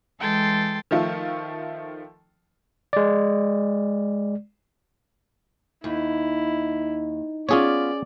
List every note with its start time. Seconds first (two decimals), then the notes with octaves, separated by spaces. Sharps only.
0.19 E3 G#3 A4 G5 C6 A6
0.91 D#3 F3 A3 F4
2.93 G#3 D5
5.84 D#2 D#4 E4
7.49 B3 C#4 F4 G#4 C#5 D5